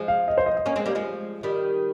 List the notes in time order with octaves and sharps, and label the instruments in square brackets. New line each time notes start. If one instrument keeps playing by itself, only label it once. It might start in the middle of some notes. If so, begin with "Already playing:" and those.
Already playing: [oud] F3 G#3
[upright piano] F5
D#5
C5
D#5
D#5
[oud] A#3 C#4
G#3 C4
G3 A#3
F3 G#3
D#3 G3